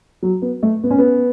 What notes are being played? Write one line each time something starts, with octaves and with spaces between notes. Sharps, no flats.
F#3
B3
A3
B3
C#4
B3